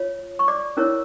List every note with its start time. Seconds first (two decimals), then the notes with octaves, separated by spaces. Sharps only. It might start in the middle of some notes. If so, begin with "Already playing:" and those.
Already playing: F4 C#5
0.39 C#6
0.48 D5 D6
0.77 C#4 E4 A#4 C#5